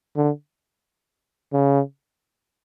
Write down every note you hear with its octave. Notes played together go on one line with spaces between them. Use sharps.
D3
C#3